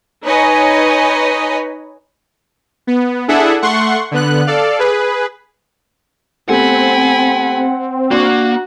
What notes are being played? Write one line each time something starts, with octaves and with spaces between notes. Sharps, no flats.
D#4 B4 C#5 D#5 G#5
B3
D4 E4 G#4 A4 E5 F#5
A3 F#5 C6 C#6
D3 B3 F#6
A4 D5 F5
G#4 B4
A3 B3 C4 G4 F#5 G#5 B5
A#3 D4 F#4 F#5 C#6